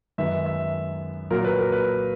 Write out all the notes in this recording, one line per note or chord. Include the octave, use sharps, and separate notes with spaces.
F#2 D#3 G#3 B3 E5
E5
A#2 F#3 A#3 A#4
B4
A#4
B4